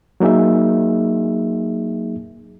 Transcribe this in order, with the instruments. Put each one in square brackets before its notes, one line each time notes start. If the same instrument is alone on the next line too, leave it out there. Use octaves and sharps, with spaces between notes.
[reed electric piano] F#3 A#3 D#4 G#4 E5